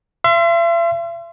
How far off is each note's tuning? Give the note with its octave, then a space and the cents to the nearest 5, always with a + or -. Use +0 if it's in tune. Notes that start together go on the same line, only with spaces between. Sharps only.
E5 +45 C6 +0